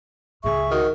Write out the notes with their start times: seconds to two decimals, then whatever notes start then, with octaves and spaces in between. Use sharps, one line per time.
0.44 C#2 G#2 G#4 E5 C#6
0.71 D#3 F#4